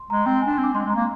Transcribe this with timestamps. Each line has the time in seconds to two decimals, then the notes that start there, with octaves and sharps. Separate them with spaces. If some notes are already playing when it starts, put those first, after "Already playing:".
Already playing: C6
0.10 G#3 A#5
0.26 C4 G5
0.42 D4 G#5
0.53 C6
0.58 C4
0.64 D6
0.74 G#3 C6
0.85 G#3
0.89 A#5
0.95 A#3